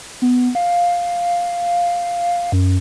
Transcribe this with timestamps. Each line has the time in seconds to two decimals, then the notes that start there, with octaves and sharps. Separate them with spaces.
0.22 B3
0.55 F5
2.52 F#2